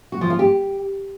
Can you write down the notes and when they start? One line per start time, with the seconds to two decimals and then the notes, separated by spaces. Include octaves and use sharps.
0.12 F#4
0.21 F3
0.30 F4
0.39 G4